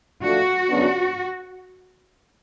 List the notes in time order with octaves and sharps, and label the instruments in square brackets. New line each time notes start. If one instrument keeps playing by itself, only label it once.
[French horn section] F3 A3 D4 F4 [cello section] F#4
[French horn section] F#2 C#3 F#3 B3 D4